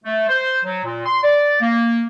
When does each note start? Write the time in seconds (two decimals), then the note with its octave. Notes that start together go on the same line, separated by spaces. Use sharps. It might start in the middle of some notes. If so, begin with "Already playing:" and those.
0.04 A3
0.28 C5
0.65 F#3
0.85 A#2
1.06 C6
1.24 D5
1.61 A#3